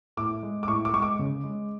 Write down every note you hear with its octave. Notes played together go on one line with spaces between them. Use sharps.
A2 D6
G#3
D6
A2 C#6
D6
G#3 C#6
D6
C#3
G#3